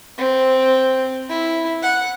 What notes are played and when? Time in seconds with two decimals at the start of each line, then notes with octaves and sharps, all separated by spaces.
0.18 C4
1.29 E4
1.82 F#5